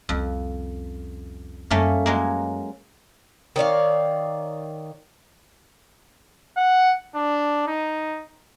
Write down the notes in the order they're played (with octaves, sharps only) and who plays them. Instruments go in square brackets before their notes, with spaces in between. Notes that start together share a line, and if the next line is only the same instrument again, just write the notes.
[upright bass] C2 C#4 [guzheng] F2
[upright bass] F#2 G3 [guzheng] A3 A#3 C#4
[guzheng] F#3 G#3 A#3
[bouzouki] D#3 C#5 D5 F5
[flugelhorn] F#5
D4
D#4